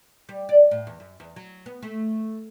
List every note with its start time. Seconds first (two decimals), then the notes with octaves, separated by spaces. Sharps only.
0.29 G3
0.49 D5
0.71 A2
0.87 E2
1.00 F#2
1.20 E2
1.36 F#3
1.66 B3
1.82 A3